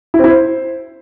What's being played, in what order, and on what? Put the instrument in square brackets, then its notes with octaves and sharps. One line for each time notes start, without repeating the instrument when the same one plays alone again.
[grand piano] E4
C4
E4
C5